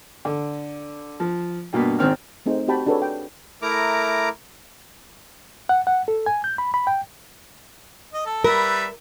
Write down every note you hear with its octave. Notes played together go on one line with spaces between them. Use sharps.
D3
F3
G2 B2 A#3 B3
G#1 D#3 C4 F6
A3 C4 D#4 G#4 C5
C4 F#4 G4 G5 A5 B5
D4 F#4 G#4 A4 B4 C#5
G5
A3 E4 A#4 A#5 D6
F#5
F#5
A4
G#5
G6
B5
B5
G5
D#5
A4
G3 A#4 B4 E5